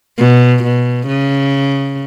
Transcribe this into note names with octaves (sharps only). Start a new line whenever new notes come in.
B2
B2
C#3